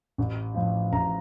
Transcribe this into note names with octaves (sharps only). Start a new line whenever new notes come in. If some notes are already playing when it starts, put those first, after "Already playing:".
A1
A2 F3
A1 A#5